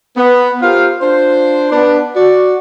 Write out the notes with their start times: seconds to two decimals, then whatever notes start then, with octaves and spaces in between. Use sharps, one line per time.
0.16 B3
0.62 F4 G4 A#4 C5 F5
1.01 D4 F4 C5
1.71 B3 D4
2.15 F#4 D5